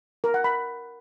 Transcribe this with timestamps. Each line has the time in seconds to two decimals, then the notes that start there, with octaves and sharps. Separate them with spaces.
0.24 A#4
0.34 F#5
0.44 B5